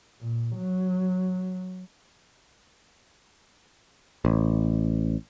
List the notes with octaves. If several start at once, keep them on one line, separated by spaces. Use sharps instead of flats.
A#2
F#3
A1